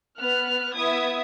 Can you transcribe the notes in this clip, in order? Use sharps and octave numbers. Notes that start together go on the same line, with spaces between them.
B3 B4 F6 F#6
B3 E4 E5 D#6 G#6